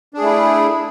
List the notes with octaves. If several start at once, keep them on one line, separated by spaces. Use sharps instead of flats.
A3 D4 E4 G#4